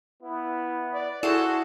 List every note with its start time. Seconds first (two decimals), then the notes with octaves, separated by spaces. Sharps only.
0.23 B3 E4
0.93 D5
1.23 E4 F#4 G#4 A4 C5